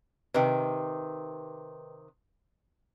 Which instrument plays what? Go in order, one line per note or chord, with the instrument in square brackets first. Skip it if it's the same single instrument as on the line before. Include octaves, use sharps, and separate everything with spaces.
[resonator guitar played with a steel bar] C3 D#3 [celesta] B4 D#5 G5